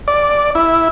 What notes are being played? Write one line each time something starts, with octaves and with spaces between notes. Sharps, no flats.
D5
E4